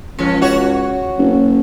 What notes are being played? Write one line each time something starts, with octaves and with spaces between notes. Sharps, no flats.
C#2 F3 C#4
F#4 C#5
F#1